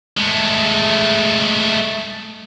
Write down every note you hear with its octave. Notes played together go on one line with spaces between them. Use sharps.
G#3 A3